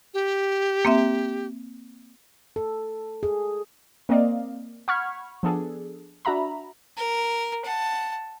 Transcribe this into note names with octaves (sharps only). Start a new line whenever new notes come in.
G4
A#3 C4 E5
A4
G#4
A#3 C4 A#4 D5 D#5 F5
F#5 B5 C#6 F6 G#6
F3 B3 D4 G#4 A4
D4 F#4 E5 A#5 B5
A#4
F#5 A5